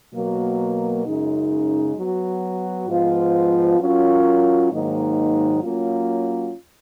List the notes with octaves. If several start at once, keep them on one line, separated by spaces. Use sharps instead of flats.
B2 F#3 A#3
F#2 C#3 G#3 D#4
F#3 B3 F#4
G#2 F3 B3 F4
F#3 C#4 F4 A#4
G#2 D#3 F#3 A#3 D#4
F#3 A#3 C#4 F4